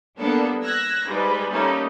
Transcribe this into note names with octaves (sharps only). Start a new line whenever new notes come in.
G3 A#3 B3 D4 A4
E6 F#6 G#6 A#6
G#2 G3 G#3 B4
G3 A3 A#3 C#4 D#4